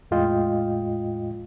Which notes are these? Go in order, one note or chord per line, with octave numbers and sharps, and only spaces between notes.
E2 A2 G#3 F4 D#5 G5